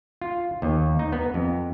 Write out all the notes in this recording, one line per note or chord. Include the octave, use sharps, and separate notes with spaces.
F4
D#2
D#4
B3
F2